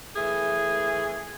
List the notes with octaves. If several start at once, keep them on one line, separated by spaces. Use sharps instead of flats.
E3 A3 G#4